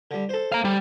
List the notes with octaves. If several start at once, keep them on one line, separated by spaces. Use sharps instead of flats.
D3 G3
A4 C5
F5 A#5
G3